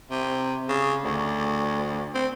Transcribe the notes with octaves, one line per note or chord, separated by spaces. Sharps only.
C3
C#3
D2
C4